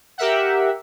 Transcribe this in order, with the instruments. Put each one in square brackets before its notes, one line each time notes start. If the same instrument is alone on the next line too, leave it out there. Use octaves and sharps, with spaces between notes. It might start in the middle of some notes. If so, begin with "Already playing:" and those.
[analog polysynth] G4 A#4 E5 F#5